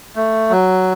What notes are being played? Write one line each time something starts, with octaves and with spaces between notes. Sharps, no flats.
A3
F#3